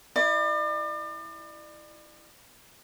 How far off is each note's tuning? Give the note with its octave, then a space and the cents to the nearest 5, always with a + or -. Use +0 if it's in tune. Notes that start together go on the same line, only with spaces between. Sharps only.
E4 +0 D5 +40